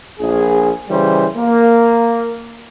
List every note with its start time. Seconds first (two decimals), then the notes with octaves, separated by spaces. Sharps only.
0.19 A#1 G#4
0.90 C#3 E3 G3 C5
1.37 A#3